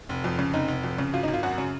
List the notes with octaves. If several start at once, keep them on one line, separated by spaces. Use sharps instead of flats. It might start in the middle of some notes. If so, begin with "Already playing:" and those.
F1
F2
C#3
F1 D#4
F1
F2
C#3
G#1 F4
D#4
G#1
F4
F#2 F#4
C#3